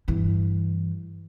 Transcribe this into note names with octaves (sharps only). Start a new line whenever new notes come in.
G2 E3